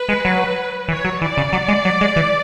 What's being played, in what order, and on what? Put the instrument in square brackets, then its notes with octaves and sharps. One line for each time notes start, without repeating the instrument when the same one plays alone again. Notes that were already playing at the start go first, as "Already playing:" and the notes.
Already playing: [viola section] B4
[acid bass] G#3
F#3
[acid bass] E3 [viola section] C#5
[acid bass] F#3
[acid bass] E3 [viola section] D5
[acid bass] C#3
F#3
G#3
F#3
G#3
E3